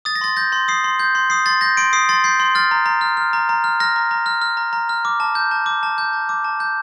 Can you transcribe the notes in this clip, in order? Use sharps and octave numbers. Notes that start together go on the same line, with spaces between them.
D#6 A6
A#6
C6 A6
G6 A#6
C6
D#6 C7
C6
G6
C6
D#6 C7
C6 A6
G6 A#6
C6 D7
D#6 C7
C6 A6
G6 C7
C6
F6 A6
A#5
A#5
F6
F6
A#5
A#5
F6
F6 A#6
A#5
A#5
F6
F6
A#5
A#5
F6
D6
A5
G6
A5
D6
A5
G6
A5
D6
A5
G6